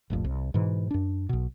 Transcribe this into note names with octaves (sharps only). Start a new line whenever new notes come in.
F1 A#1 F2 A2
C2
G#2 B2 E3
F#2 D4
B1 B2